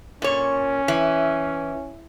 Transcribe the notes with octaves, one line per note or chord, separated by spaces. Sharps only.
A#2 C#4 C#5
E3